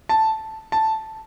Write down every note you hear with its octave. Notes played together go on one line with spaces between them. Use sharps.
A5
A5